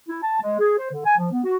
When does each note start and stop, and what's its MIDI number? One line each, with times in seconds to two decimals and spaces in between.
0.08 0.18 64
0.23 0.38 81
0.41 0.57 56
0.59 0.73 68
0.78 0.88 72
0.91 1.05 50
1.05 1.17 80
1.18 1.30 53
1.32 1.42 59
1.44 1.57 66